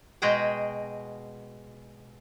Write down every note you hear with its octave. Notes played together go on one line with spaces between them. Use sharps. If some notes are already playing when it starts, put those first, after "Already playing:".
B2 G#3 F#4 G#4 G5 A#5